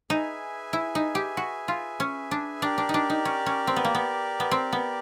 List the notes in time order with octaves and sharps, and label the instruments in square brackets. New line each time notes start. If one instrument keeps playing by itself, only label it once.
[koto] D#4 [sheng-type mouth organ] G#4 B4 E5 G#5
[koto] E4
D#4
G4
F#4
F4
C#4
D4
[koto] D4 [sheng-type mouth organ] G4 A#4 D5
[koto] D4
D#4
D4
D#4
C#4
C#4
C4
B3
A#3
B3
B3
C4
B3